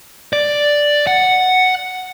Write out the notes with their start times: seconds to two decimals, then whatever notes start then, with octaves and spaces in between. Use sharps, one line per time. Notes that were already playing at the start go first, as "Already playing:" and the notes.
0.33 D5
1.07 F#5